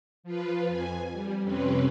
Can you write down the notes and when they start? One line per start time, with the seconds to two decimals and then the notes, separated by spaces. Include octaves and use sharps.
0.23 F3 F4 B4
0.67 F2 G#5
1.13 G3
1.43 F2 C3 C4 C#4 B4